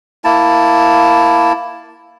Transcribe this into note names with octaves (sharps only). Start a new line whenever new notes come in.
A#3 E4 A5